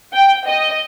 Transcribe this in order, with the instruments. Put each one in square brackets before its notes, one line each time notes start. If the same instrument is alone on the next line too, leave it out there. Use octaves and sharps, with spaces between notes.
[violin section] G5
D#5